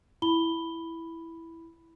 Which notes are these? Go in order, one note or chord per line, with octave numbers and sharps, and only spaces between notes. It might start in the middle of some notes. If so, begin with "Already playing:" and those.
E4 B5 G7